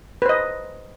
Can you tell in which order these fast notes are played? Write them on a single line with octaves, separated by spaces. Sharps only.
B4 C5 D#5